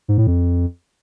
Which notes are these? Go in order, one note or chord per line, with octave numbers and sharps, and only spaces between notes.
G#2
A2
F2